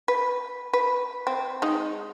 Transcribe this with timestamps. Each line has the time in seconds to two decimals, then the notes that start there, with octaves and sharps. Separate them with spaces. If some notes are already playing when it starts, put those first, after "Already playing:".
0.08 B4
0.73 B4
1.27 C4
1.62 G#3 D#4